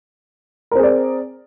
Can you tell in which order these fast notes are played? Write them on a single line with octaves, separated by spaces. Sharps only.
A#4 C4 G#4 D5